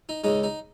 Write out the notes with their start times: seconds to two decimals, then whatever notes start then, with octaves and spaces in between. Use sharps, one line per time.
0.09 D#4
0.24 C#2 C#3 G#3 D#4
0.43 D#4